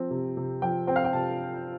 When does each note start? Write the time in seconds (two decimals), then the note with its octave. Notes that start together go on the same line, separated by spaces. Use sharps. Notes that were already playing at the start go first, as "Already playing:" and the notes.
Already playing: F3 C4
0.11 C3
0.37 C3
0.62 F3 G5
0.87 C4 G5
0.96 F5
1.04 G5
1.13 C3 A5